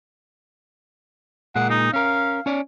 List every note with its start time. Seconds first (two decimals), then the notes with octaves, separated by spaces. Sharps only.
1.55 A#2 G#3 A#3 F#5
1.70 D#4
1.94 C#4 A#4 F5
2.46 C#4 C#5 D5